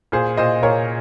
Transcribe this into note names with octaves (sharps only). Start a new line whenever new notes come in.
A#2 G#4 C5
A#2 C5 D#5
A#2 A#4 C#5